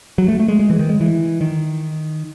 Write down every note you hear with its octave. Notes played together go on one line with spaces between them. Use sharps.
F#3
A3
A3
G#3
G#3
E3
D#3
G#3
E3
D#3